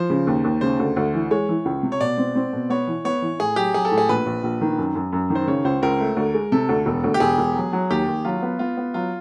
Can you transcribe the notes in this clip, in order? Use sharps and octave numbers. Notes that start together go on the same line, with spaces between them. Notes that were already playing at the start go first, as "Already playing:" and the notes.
Already playing: F3 C5
C#3
D#2
D#2
C#3 C5
D2
D2
E3
G#3 C#5
E3
C#2
C3
C#5
B2 D5
C4
C4
B2
B3 C#5
E3
B3 C#5
E3
A2 G#4
F#3 G4
F#3 G#4
A4
A2
G#4
A#1 B4
A#1
A#1
D#3
F#2
F#2
F#2
D#3
C5
C#3 C#5
C#2 C5
C#2 A#4
A3
D2
G#3
C3 A4
D2
E1
D2
G4
E1 G#4
E1
F#3
F#3
D#2 G4
D#2
F#3 F4
B3
B3 F4
B3
F#3 F4